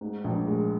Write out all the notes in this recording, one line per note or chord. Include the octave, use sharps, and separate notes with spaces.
G#2
A#1
G#3